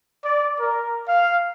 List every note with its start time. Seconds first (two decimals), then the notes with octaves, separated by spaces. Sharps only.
0.23 D5
0.58 A#4
1.07 F5